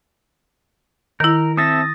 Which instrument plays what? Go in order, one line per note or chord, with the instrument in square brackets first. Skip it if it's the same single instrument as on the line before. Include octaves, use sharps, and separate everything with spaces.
[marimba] D#3 E4 [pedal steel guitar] A#4
[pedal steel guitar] C4 A4 E5 [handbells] D#6 A6 A#6